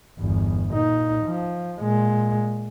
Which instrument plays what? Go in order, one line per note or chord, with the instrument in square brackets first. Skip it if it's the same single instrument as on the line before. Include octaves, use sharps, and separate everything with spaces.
[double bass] G1 E2
A#2 D#4
F3
A#2 G#3